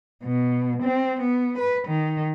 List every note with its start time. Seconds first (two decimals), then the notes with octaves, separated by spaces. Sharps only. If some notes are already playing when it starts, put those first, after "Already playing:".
0.24 B2
0.83 C4
1.21 B3
1.58 B4
1.88 D#3